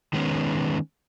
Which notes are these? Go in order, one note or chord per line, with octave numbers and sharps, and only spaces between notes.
D#3 G#3 B3 C#4